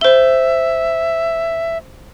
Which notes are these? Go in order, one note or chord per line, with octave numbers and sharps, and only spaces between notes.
C5 E5 G7